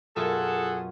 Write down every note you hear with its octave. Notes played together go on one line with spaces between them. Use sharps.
F#2 B2 F4 G#4 A4 F#5